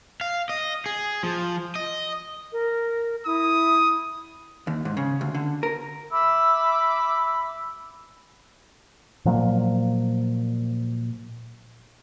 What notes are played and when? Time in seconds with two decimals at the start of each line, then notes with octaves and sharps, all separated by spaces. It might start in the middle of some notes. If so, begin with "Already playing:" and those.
0.21 F5
0.49 D#5
0.86 G#4
1.23 F3
1.75 D#5
2.52 A#4
3.26 E4 D#6
4.67 D#2
4.85 G#2
4.97 C#3
5.21 D2
5.35 D3
5.63 A#4
6.11 E5 B5 D6 E6
9.25 A#2 F3 F#3 A#3